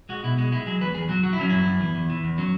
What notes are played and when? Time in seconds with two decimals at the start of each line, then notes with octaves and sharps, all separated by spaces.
0.09 G#3 F#4
0.24 B2 E4
0.38 G#3 F#4
0.52 G#3 E4
0.66 F#3 G#4
0.81 E2 B4
0.94 E2 G#4
1.09 F#3 F#4
1.23 F#3 F#4
1.33 E4
1.38 F#3 C#4
1.50 F#2 E4
1.66 F#2
1.80 E2
1.95 E2
2.10 E3
2.24 E2
2.38 F#3 C#4